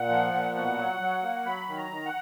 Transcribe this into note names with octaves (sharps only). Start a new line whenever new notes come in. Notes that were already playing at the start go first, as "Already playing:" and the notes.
Already playing: A#2 F#5
F3
A#2
B2 F#5
F#3
F#3
A#3
F#3 B5
D#3
A#5
D#3
F#5